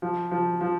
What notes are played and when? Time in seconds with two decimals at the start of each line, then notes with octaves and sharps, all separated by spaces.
0.02 F3
0.31 F3
0.61 F3